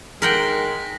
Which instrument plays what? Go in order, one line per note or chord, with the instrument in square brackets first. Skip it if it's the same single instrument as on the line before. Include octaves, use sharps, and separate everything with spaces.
[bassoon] D#3 [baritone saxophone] G#3 [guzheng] A#4 F#5 G5 [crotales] A#6 B6